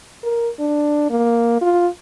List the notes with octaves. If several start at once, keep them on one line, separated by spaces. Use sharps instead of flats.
A#4
D4
A#3
F4